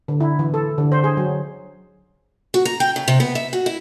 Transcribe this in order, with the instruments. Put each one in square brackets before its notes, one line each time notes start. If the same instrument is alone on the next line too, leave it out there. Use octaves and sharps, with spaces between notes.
[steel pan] D3
E4
E3
A4
D3
C5
G#4
F#3
[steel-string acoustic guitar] F#4
A#5
G5
C#3
C3
B3
E5
F#4
E4